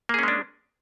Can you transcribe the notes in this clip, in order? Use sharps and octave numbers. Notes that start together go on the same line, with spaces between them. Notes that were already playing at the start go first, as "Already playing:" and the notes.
G#3 A#3 C#4 D4 G#4